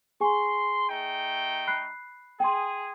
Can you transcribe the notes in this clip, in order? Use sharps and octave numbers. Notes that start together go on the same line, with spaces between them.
G#4 G#5 C6 C#6
A3 D#4 G5
B5 F#6 C7
G#4 G5 C6